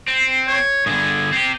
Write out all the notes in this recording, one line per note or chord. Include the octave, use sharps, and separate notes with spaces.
C4
C#5
G2 D3 G#4
C4 G4